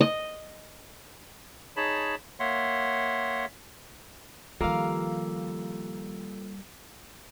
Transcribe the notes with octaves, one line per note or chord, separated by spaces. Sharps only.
D#5
D#4 G#4 C#5 A5 B5
A#3 C#5 E5 F#5 C6
D#3 F3 G3 A#3 F4 A4 F5 E6